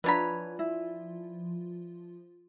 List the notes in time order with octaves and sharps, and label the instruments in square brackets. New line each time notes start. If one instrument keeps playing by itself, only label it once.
[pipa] E3 D4 B5 [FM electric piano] F3 F4 [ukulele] B4 C#5 A#5
[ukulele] E4